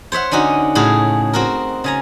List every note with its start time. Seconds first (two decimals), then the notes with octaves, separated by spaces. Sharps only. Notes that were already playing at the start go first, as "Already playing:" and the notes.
0.12 C5 C#5 E5 F#5
0.31 D3 C#4 D#4 F#4
0.75 A2 C#3 F#4 G#4
1.33 C4 F#4 A#4
1.84 C#3 G#5 A#5